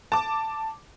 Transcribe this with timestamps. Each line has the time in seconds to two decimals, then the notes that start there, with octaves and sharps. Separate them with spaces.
0.12 A5 D6